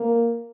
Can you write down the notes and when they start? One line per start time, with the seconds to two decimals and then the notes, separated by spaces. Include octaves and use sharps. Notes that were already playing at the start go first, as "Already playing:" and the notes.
Already playing: A#3